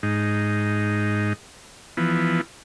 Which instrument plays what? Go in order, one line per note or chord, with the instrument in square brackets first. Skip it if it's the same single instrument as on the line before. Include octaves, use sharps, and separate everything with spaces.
[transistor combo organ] G#2 D#4
E3 F3 B3